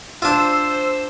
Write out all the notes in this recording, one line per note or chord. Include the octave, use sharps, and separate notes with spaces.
D4 F4 C5 E6